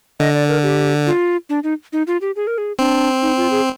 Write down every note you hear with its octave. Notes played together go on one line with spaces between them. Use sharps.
D3 D#5
D5
A#4
G4
F4
D4
D#4
D#4
F4
G4
G#4
A#4
G#4
C4 D4
D#4
F4
G#4